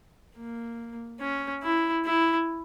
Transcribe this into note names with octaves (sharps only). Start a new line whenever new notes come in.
A#3
C#4
E4
E4